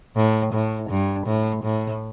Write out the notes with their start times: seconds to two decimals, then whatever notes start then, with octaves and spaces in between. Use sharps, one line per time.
0.17 A2
0.53 A2
0.90 G2
1.27 A2
1.64 A2